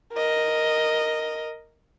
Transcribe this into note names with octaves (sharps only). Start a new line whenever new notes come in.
A#4 D#5